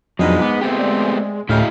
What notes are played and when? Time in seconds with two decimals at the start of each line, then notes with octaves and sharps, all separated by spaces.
0.19 F2 G#2 B2 F3 F#3 D4 B4 D#5
0.42 G#3 B3 D6
0.61 A3 B3 C4 G4
0.79 D5
1.49 D2 A2 C#3 E4 F#4 G4 D#5 F5